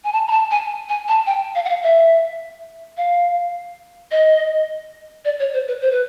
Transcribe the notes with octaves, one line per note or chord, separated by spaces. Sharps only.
G#5
A5
A#5
A5
G#5
G#5
A5
G5
F5
F#5
F5
E5
F5
D#5
D5
C#5
C5
B4
C5
B4